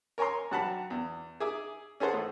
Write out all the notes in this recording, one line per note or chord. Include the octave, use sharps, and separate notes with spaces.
A#4 C#5 G#5 A#5 C6
G2 F#3 F#5 A5 B5
E2
G#4 E5 D6 D#6
C#4 G#4 A4 C5 F#5
A2